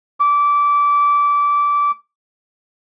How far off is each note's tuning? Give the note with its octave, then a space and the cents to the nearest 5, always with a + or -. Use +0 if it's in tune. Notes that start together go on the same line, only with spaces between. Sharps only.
D6 -20